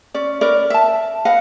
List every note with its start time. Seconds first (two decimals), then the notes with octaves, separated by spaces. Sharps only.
0.14 C#4 D5
0.41 C#4 A#4 B4 D5
0.70 E5 A5
1.25 B4 D#5 F5 F#5